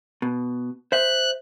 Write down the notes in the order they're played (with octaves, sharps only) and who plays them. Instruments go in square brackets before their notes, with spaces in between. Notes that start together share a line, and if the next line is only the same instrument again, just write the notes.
[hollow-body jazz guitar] B2
[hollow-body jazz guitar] C5 E5 [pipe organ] F#6